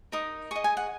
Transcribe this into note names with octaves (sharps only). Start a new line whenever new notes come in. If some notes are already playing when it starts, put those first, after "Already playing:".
D#4 A#4 D#6
G#4 D#5 C#6
G#5
F#5